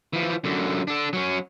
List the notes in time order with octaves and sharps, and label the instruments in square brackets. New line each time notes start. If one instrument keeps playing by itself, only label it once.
[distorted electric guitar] E3 F3
F#2 D3
D4 A4
F#3 C#4